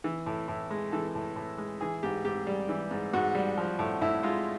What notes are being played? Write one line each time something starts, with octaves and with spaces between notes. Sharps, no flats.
E3
A2
A2
G#3
E3 A4
A2
A2
G#3
E3 G#4
G#2 G4
G#2 G4
G3
E3
G#2
G#2 F#4
G3
F3
A2
A2 E4
G#3 F4